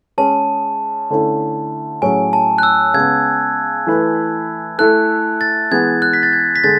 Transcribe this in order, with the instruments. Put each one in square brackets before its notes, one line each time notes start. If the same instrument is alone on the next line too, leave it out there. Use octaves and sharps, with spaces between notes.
[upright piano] G#3 C#4 G#4 [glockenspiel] A5
[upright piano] D3 A3 C#4 E4
[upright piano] A2 F#3 C#4 G#4 [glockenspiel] G#5
[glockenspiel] A5
F#6
E6
[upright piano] C#3 G#3 B3 [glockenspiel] G#6
[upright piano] E3 A3 E4 B4
[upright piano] A3 E4 A4 [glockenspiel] F#6
[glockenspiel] A6
[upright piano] E3 G#3 B3 [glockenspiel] G#6
[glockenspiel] F#6
B6
A6
G#6
B6
[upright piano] D3 G#3 [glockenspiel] A6